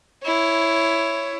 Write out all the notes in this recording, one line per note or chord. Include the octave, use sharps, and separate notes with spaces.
E4 C#5